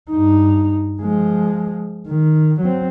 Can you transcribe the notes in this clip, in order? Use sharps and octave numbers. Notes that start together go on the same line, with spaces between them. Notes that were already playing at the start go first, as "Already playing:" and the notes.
G2 D#4
F3 G#3
D#3
F#3 C4